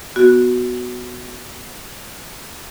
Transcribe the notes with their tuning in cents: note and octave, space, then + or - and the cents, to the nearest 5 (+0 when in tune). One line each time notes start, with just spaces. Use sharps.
B3 +0 F#4 +0